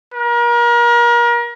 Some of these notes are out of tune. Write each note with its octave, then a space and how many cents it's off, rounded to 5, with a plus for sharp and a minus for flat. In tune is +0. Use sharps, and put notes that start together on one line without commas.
A#4 +35